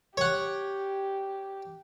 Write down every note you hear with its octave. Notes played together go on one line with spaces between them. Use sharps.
G4 C#5 F#5